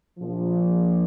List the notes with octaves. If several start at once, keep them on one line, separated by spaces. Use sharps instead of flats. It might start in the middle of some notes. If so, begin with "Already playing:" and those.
A#1 A#2 F3